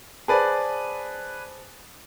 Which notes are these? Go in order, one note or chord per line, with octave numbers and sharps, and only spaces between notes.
G#4 B4 C5 D5 A5